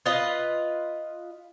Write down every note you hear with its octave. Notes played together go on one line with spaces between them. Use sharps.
F4 B4 D#5